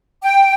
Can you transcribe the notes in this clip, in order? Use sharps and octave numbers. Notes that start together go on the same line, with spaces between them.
G5